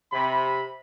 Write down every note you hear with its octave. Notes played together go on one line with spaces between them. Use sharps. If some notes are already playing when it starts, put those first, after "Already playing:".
C3 B5